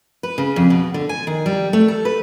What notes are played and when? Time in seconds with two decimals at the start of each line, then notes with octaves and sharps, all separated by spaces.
0.23 B4
0.38 C#3
0.56 F2
0.70 B2
0.94 D3
1.09 G#5
1.27 D#3
1.46 G3
1.73 A3
1.88 A4
2.05 B4